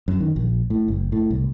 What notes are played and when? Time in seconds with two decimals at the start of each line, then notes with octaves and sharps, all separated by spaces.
0.08 F#2
0.20 D#3
0.36 A#1
0.70 A2
0.88 F#1
1.12 A2
1.31 C2